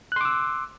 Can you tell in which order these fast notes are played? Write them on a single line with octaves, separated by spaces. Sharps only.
F#6 C6 D6 E6